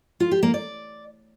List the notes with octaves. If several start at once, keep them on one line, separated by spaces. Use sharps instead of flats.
F4
G4
A#3
D5